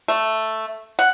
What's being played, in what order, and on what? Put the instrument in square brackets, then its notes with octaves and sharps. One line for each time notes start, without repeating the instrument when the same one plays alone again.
[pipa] A3
F#5